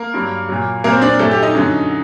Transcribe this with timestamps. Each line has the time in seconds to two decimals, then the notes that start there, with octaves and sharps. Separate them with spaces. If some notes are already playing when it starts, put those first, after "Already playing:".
Already playing: A#3 A#4
0.14 G2 F#3
0.49 A#2 F#3
0.84 A#2 F#3 A#3 A#4
0.93 C4 C5
1.02 D4 D5
1.19 A#2 F#3 A3 A4
1.31 G4
1.43 D#4 D#5
1.55 F#2 D3 F#3